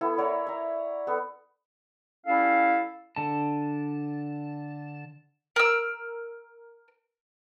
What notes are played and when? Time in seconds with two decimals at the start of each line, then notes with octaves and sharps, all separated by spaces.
0.01 B3 E4 A4
0.17 A#4 C#5 D5 F#5
0.47 E5 A#5
1.07 B3 A4
2.27 G3 C#4 E4 A4 F5
3.16 D3 A5
5.56 A#4 E6